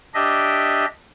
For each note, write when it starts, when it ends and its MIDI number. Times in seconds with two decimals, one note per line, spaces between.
0.14 0.85 62
0.14 0.85 67
0.14 0.85 75
0.14 0.85 76